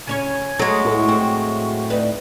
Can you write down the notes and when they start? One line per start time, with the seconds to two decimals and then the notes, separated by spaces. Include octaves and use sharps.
0.07 C#3 C#4 C#5 G#5
0.59 F#3 G#3 A3 G#4 C#6
0.85 A2
1.09 C4
1.90 D2 D#4 B4 D5